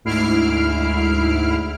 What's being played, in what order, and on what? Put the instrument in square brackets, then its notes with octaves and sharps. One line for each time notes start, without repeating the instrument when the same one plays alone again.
[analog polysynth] D2 G#2 E4 F6 C7 D7